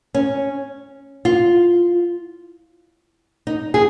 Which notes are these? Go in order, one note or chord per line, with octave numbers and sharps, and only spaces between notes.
C#4
F4
D#4
G#4